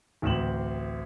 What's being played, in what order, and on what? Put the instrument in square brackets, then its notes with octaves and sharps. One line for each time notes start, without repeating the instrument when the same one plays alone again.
[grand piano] A1 D2 C4 E7 F#7